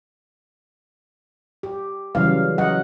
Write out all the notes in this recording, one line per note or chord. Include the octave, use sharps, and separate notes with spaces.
G4
C#3 E3 F#3 G3 F5
F#3 D#5 F#5